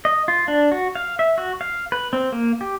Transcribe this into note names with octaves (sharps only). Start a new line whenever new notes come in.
D#5
F4
D4
F#4
F5
E5
F#4
F5
B4
C4
A#3
G4